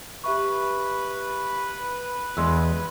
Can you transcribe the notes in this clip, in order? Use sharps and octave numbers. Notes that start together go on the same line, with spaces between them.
G4 B4 E5 C#6
E2 G#3 C6 E6